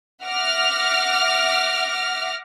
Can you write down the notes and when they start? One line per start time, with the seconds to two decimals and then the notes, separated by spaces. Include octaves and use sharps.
0.25 E5 F#5 D6 F6 A#6